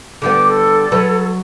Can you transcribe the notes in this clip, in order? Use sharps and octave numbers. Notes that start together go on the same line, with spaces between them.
D3 G3 B3 D6
A4
F#3 B4